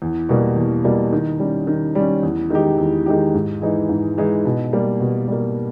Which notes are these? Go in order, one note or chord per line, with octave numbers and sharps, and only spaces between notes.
E2
B2 G3 A#3
E2
B2 G3 A#3
D#3
G3 C#4
D#3
G3 C#4
E2
D#3 G#3 D#4 G4
E2
D#3 G#3 D#4 G4
G#2
E3 G#3 D#4
G#2
E3 G#3 D#4
B2
G3 A#3
B2
G3 A#3